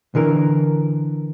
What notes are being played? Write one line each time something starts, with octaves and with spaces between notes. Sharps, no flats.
D3 E3 A#4